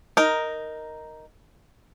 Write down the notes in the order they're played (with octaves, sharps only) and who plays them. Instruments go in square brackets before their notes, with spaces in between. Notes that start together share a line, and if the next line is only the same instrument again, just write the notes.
[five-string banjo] D#4 A#4